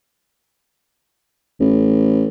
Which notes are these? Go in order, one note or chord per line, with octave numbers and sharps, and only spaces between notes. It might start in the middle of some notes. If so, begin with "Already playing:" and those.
A1